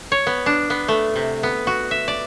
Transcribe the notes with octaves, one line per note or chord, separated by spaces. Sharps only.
C#5
B3
D4
B3
A3
C3
B3
F#4
E5
D5